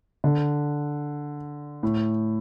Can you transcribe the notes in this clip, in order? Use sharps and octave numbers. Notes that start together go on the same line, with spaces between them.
D3
A2